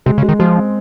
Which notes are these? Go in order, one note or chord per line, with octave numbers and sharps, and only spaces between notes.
C3 G#3
C#3
G#3
D#3
F3 G#3
C4